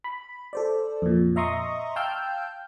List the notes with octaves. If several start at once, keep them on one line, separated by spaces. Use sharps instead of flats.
B5
A4 C5 D5
F2 A#2
D#5 E5 A#5 C6 C#6 D#6
F5 G5 A5 E6 F6 G6